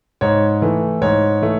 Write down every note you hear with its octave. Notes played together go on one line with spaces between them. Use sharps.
G#2 C#5
E3 A3
G#2 C#5
E3 A3